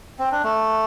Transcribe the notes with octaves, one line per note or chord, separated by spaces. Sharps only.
C4
D4
A3